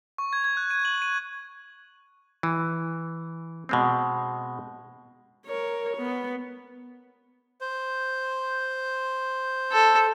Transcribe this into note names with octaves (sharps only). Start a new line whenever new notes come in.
C#6
G#6
G#6
F#6
D#7
F#7
D#7
E3
B2 G#3 C4
A#4 C#5
B3
C5
A4